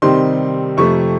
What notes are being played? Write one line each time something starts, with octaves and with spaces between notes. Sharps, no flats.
C3 D#3 G3 C4 D#4 C6
F2 C3 F3 A3 C#6